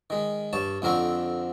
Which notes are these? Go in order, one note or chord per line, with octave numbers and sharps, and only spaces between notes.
D#3 G#3
G2 C#5 A5
F2 D3 C4 A#4 C#6